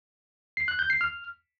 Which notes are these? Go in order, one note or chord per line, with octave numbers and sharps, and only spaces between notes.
C7
F#6
G6
C7
F6